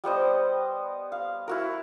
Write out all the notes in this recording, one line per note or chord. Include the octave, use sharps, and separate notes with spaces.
G3 B3 C5 D#5
F5
E4 F#4 A#4